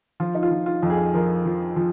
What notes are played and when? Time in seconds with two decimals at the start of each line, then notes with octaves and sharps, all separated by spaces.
0.20 F3 F4
0.35 D#4
0.43 F4
0.51 F3
0.66 F4
0.83 F2
0.90 G#4
1.14 F3 A#4
1.46 F3
1.76 F3